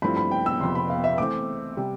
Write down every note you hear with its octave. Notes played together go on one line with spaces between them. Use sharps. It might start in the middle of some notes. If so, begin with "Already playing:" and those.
G2 F3 A3 C4 E4 B5
B5
G5
E6
F2 C3 F3 C6
B5
F5
E5
E3 A3 C4 D6
C3 G3